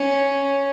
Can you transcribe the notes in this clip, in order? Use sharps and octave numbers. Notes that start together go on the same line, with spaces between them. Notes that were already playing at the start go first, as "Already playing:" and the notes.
Already playing: C#4